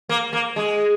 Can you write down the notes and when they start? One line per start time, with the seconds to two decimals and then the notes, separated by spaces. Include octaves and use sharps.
0.09 A#3
0.33 A#3
0.56 G#3